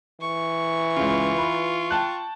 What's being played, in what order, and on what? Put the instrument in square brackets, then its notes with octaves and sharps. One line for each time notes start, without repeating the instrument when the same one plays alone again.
[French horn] E3 [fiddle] C#6
[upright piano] C#2 C#3 [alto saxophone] F4
[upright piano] B4
G5 A5 F#6